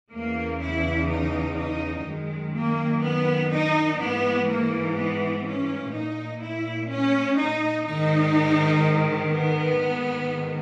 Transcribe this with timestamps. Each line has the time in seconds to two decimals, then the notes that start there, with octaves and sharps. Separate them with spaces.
0.12 E2 C#3 E3 A#3
0.60 E4
1.09 D#4
1.57 D#4
2.05 F#2 D#3 G#3
2.54 A#3
3.01 B3
3.51 D#4
3.98 G#2 E3 B3
4.47 A#3
4.96 B3
5.43 C#4
5.92 A#2 D#4
6.40 E4
6.88 C#4
7.37 D#4
7.85 G#2 D#3 D#4
9.30 B3
9.78 G#2 D#3